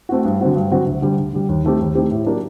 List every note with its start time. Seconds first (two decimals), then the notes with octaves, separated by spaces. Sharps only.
0.09 A3 C4 F#4
0.25 G2
0.41 D3 F#3 C4 F#4
0.56 G2
0.71 D3 F#3 C4 F#4
0.87 D2
1.02 D3 G3
1.18 D2
1.33 D3 G3
1.49 D#2
1.64 D#3 A3 C4 G4
1.81 D#2
1.95 D#3 A3 C4 G4
2.11 A2
2.26 F#3 A#3 D4 G4